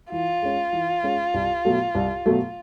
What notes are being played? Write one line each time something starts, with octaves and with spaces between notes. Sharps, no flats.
E3 F4
G#3 C#4
E3
G#3 C#4
C2
B2 F#3 A3
C2
B2 F#3 A3